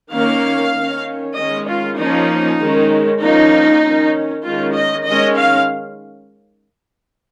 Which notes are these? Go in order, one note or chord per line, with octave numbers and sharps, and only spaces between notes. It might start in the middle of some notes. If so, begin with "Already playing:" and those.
D#3 A#3 C#4 F5
D#3 C#4
D#3 G#3 C#4 D#5
F4
F3 A#3 C#4 D#4
D#3 G#3 C#4
F3 A#3 C#4 D#4
D#3 C#4
D#3 G#3 C#4 F4
D#5
D#3 G#3 C#4 D#5
F5